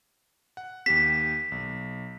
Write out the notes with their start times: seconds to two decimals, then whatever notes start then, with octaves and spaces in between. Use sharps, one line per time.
0.57 F#5
0.86 D#2 G4 B6 E7
1.52 B1